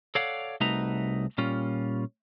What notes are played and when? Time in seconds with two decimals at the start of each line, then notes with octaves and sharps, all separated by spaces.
0.15 A4 C#5 D5 F5 F#5
0.61 C2 A3 D#4 F#4 B4 A#5
1.38 A#2 G3 C#4 F4